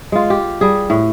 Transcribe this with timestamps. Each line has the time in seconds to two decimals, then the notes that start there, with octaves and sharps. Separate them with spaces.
0.12 G#3 F4
0.30 G4
0.61 G3 G#4
0.90 A2